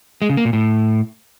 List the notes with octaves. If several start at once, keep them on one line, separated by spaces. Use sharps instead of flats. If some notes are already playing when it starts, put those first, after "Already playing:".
G#3
C#3
A#3
A#2
A2